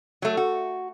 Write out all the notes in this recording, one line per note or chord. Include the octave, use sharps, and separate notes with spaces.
F#3 A3
F#4